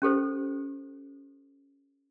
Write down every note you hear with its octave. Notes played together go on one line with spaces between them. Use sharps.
C#4 G4 A4 C5